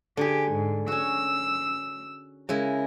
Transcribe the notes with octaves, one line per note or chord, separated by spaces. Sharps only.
D3 G4 G#4
G#2
C#4 F#4 E6
C#3 G#3 E4 A#4